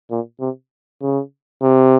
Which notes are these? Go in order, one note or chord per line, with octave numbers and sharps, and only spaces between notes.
A#2
C3
C#3
C3